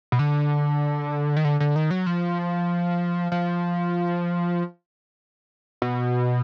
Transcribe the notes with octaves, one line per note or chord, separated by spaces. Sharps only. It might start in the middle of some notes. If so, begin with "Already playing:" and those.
B2
D3
D#3
D3
D3
D#3
F#3
F3
F3
B2